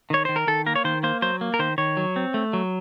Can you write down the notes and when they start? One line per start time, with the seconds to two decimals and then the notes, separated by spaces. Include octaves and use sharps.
0.10 D#3 C#5
0.25 D#3 C5
0.36 A#4
0.47 D#3 A4
0.66 A#3 A#4
0.76 C#5
0.84 D#3 C5
1.03 A#3 C5
1.22 F#3 C5
1.41 A#3
1.54 A#4
1.59 D#3 C5
1.78 D#3 C#5
1.97 F#3
2.16 C4
2.34 A3
2.53 F#3